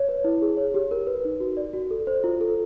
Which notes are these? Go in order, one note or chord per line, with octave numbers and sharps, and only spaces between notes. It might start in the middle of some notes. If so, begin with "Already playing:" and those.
Already playing: C#5
B4
E4
G#4
C#5
G4
A#4
B4
D#4
F#4
D5
F#4
A4
C5
F4
A4